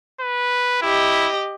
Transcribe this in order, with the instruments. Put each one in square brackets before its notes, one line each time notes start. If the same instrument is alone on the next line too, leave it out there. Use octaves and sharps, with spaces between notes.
[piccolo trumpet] B4
[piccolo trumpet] E4 [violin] G4 D#5